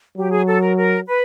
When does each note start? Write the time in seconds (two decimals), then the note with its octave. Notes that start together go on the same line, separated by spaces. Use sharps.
0.17 F#3 G4
0.31 G#4
0.47 A4
0.62 A#4
0.77 A#4
1.07 B4